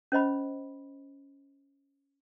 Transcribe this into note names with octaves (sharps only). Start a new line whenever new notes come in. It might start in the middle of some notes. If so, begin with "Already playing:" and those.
C#4 C5 D#5 B5